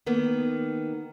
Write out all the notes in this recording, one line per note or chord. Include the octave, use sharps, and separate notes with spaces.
D#3 A#3 B3